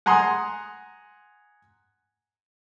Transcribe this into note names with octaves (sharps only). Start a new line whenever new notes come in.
F#5 G#5 A#5 C6 D#6